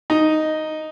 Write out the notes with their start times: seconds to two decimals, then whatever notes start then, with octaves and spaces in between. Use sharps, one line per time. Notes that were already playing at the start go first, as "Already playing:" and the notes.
0.10 D#4